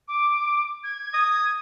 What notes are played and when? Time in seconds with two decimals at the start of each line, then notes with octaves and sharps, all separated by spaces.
0.08 D6
0.83 G#6
1.14 D#6